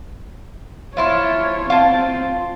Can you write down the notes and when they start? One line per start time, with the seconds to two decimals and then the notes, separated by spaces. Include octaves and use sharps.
0.97 F3 E4 F4 C#5
1.70 C4 F4 A5